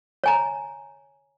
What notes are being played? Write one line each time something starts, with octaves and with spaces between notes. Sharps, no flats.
C#5 G#5 A#5